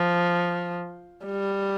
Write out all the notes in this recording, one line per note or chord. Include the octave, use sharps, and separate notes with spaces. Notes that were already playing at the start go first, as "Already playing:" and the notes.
Already playing: F3
G3